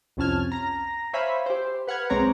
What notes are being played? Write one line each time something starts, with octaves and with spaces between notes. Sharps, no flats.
C2 F2 C#4 A5 F6 G#6
A#5 A#6
C5 C#5 E5 F5 G#5 B5
G4 C5
B4 F#5 F6 G#6
B1 G#3 C4 C#5 A#5 D6